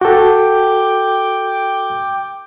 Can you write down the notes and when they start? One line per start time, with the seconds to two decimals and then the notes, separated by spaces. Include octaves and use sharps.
0.01 F#4 A4 G5 D6